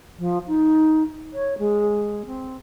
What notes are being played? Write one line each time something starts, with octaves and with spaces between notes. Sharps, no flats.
F3
D#4
C#5
G#3
C4